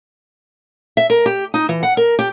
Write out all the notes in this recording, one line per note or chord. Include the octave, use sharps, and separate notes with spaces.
E5
A#4
G4
D#4
E3
F#5
A#4
G4